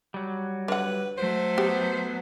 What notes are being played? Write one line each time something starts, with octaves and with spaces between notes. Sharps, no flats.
F#3 G3
D3 B4 F#5
F#3 A3 C5
B3 G4